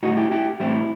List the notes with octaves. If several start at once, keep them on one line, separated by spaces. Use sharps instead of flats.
A2 G3 D#4 F#4
E4 G4
E4 G4
A2 E3 G3 C4 E4